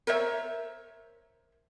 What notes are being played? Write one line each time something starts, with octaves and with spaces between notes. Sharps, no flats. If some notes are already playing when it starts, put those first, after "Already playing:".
A#4 C5 C#5 E5